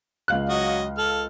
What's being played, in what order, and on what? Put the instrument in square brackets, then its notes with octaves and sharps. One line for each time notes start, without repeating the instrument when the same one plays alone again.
[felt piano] C#2 F5 F#6
[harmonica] F#3 F#4 D#5
A4 F6